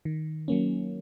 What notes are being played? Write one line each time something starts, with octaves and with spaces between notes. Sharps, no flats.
D#3
F#3 A#3 C#4